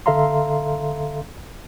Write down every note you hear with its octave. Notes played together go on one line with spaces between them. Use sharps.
D3 A4 E5 F5 A#5 C6